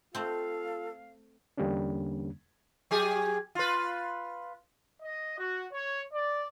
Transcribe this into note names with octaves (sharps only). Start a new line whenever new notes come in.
A3 C4 F4 A4 F5
E2 D3 G3 A#3 C#4 D4
F#3 G4 G#4
F4 B4
D#5
F#4
C#5
D5